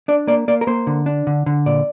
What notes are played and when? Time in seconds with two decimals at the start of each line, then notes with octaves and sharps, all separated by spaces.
0.08 D4 D5
0.27 A#3 D5
0.48 A#3 D5
0.61 A#4
0.67 A#3 C5
0.87 D3
1.06 D4
1.27 D3
1.46 D3
1.66 A#2 D5